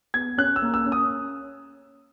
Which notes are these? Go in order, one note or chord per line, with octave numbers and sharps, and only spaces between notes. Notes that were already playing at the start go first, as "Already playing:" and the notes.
B3 G#6
C#4 F#6
E6
A#3
E6
C#4
D#6